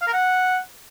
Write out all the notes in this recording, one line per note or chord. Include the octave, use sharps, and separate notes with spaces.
F5
A#4
F#5